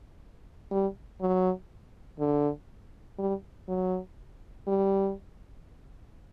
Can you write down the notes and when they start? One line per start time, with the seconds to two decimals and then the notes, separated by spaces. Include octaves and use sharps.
0.71 G3
1.21 F#3
2.19 D3
3.19 G3
3.68 F#3
4.67 G3